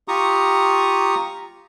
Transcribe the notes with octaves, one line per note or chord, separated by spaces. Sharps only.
F4 G4 A#5 C#6 D#6